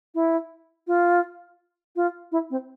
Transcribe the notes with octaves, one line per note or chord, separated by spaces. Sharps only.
E4
F4
F4
E4
C4